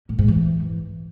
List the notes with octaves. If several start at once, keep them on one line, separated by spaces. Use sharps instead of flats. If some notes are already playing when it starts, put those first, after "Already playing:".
A2
G#2
E3